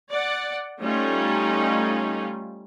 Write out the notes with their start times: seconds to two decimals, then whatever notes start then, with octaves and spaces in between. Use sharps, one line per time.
0.10 D5 F#5
0.80 G3 A3 C#4 D#4 F4